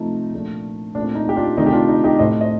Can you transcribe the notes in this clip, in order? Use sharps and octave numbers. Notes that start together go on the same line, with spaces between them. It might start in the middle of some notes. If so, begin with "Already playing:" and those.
Already playing: C3 F3 A3 D#4
A#2 F3 A3 D4
A#2 A3 C4 D4
D#4
G4
D4 F4
C3 D#3 A3 D4 D#4
G4
D4 F4
D#4
D#4 G4
A2 A3 C4 C5 D#5
C5 D#5